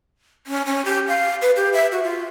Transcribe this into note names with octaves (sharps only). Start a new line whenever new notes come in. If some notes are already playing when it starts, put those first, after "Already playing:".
C#4
C#4
G4
F5
B4
G4
E5
F#4
F4